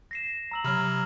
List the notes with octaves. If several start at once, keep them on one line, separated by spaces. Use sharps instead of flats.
A#6 C7 E7
A#5 E6 F#7
C3 F#3 B5 F6